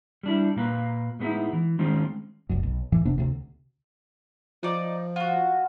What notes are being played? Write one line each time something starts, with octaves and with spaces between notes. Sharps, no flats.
G3 D4 E4
A#2 A#3 B4
A2 G#3 B3 C4 D#4 E4
E3
D#3 G#3 C4 C#4 F4
F1 C2 F#2
B1
F2 A2 E3
F1 C3 B3 D4
D2 C3
F3 D#4 D5
F4 F#4